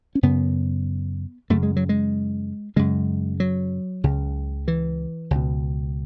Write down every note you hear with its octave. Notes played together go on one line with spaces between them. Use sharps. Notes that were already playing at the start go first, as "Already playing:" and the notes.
C#4
F#2 C#3 B3
F#2 C#3 A3
G#3
F#3
G#3
F#2 C#3 G#3
F#3
C#2 C#3
E3
C#2 B2